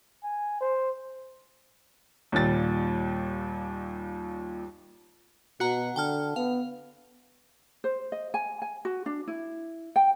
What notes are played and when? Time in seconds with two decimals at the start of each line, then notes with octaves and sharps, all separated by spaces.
0.23 G#5
0.61 C5
2.32 D#2 A#2 G3 A6
5.60 B2 F#4 F#5 A#5
5.96 D3 G5 A5 F6
6.36 B3 F5
7.84 C5
8.12 D#5
8.34 G#5
8.62 G#5
8.85 F#4
9.06 D4
9.28 E4
9.96 G5